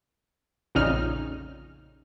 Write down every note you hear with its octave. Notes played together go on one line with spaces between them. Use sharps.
A#1 F2 A#2 C#3 D#4 F6